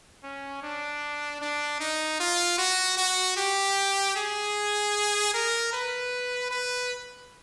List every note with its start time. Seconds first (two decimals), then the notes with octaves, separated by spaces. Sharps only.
0.23 C#4
0.62 D4
1.41 D4
1.80 D#4
2.20 F4
2.58 F#4
2.97 F#4
3.37 G4
4.16 G#4
5.34 A#4
5.73 B4
6.51 B4